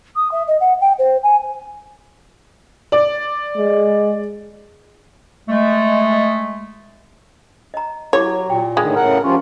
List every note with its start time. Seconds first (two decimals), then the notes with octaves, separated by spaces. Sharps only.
0.15 D#6
0.31 E5
0.47 D#5
0.60 F#5
0.81 G5
0.98 C5
1.23 G#5
2.92 D5
3.57 G#3
5.48 G#3 A3
7.74 D#5 A#5
8.13 F#3 E4 G4 C#5 D6
8.50 A#2 G4 G5
8.77 A2 D3 D#3 G#3
8.96 A2 C#3 A#4 F#5
9.24 F3 G3 C#4 F4